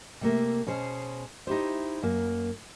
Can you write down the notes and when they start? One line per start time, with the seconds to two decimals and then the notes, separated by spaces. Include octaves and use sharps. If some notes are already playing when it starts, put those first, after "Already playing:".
0.21 C3 A3 A#3
0.67 B2 C#4 G#4 C5
1.47 D#4 E4 G4 C5
2.03 F#2 A#3